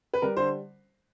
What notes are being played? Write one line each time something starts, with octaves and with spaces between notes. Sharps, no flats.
B4
G3 A#4
D3 C5